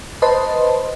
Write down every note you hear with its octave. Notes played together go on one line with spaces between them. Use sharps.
B4 C5 D#5 A5 C6